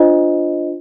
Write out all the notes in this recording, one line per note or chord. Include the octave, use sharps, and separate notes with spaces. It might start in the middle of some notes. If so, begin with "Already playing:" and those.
Already playing: D4 F4 C5 D#5